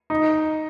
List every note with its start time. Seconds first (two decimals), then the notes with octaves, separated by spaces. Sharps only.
0.10 D#4